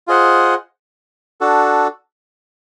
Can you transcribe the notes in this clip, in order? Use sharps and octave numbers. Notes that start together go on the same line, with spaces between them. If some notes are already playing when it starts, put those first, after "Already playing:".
F4 G#4 C5 D#5 F#5
D4 F#4 A4